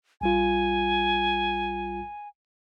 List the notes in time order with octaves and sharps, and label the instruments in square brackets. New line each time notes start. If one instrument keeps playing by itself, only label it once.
[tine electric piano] A#1 G3 F4 [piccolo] G#5